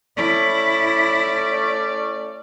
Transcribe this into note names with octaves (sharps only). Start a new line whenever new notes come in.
A3 C#4 E4 D5